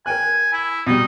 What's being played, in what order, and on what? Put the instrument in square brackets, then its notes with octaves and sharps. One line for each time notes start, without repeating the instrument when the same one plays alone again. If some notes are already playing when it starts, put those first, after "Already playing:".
[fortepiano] A#4 G5 F#6 [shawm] G#5
[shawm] E4
[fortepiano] B2 G3 [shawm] D#4